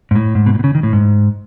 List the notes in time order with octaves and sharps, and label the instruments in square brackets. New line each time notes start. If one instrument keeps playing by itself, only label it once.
[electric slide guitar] G#2
A2
G#2
B2
A2
B2
C#3
D#3
A2
G#2